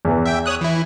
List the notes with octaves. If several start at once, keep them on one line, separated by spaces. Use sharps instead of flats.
E2 E3
E5 G5
C#5 D#6 F#6
E3 E4